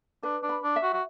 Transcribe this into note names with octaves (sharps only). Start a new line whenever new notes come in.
D4 B4
D4
B5
D4
E5
F#4
F#4